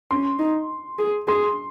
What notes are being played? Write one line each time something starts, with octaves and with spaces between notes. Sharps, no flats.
C#4 C6
D#4
G#4
G#4 C6